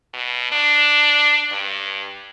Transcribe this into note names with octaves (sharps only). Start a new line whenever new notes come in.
B2
D4
G2